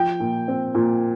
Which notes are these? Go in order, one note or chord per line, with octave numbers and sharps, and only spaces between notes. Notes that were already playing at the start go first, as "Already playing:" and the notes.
Already playing: F3 G5
A#2
C4
A#2